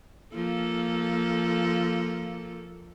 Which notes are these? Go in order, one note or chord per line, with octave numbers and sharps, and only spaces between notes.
F3 A#3 A4